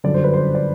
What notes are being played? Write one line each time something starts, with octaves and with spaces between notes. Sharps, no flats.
G1 F#2 D3 F#3 D5
C5
B4
C5
D5